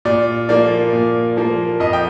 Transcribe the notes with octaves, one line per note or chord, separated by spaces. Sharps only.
A#2 D5
F3 A#3 D5
A#2
F3 A#3
F2 D#5
G5